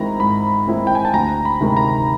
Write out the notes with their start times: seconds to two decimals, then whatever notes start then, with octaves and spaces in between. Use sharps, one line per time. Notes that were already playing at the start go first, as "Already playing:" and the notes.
Already playing: D#3 G#3 C4 E4 A#5 B5
0.19 G#2 B5
0.67 D#3 G#3 C4 E4
0.87 G5
0.95 G#5
1.05 A5
1.13 D2 A#5
1.45 B5
1.61 C3 D#3 G#3
1.77 A#5